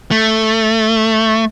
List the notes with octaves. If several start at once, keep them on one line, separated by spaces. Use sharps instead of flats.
A3